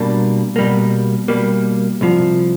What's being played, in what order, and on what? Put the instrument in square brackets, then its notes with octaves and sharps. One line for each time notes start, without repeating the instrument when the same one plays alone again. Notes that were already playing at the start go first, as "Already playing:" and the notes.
Already playing: [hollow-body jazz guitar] B2 G3 A#3 D4
B2 G3 A#3
B2 G3 A#3
C2 C3 F3